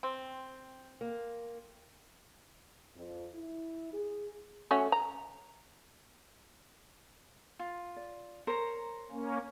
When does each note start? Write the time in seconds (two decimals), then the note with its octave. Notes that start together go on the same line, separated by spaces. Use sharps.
0.03 C4 G5 C6
1.01 A#3
2.95 F2
3.34 E4
3.92 G#4
4.71 A3 C#4 F#4
4.92 A#5
7.59 F4
7.96 D5
8.47 A#4 C5 C#5 A#5
9.11 A#3 C#4